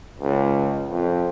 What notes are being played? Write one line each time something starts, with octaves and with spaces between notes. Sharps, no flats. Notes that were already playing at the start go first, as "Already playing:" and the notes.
C#2
F2